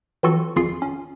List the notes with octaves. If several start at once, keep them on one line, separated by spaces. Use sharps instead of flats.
E3 F#3 C4 F4 F#4 A4
G#1 F2 F4 G#4 C7
C#4